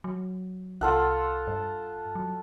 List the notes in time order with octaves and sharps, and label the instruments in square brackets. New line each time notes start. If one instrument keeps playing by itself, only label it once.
[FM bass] F#3
[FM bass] C2 [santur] F4 A4 F#5
[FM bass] G2
F#3